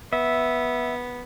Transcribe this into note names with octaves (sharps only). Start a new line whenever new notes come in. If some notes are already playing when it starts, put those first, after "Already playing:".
B3 E5